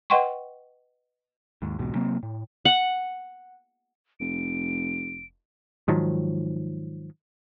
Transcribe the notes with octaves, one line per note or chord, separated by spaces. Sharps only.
B4 D#5 F#5 G5 C6 C#6
D#2 G#2
B1 E2 G#2 B2
C3 F#3 A#3 C4
A2
F#5
F1 D7
G#2 D#3 F3 F#3